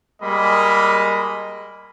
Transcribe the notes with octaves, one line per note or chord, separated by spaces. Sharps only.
G3 G#3 A#3 D#5 B5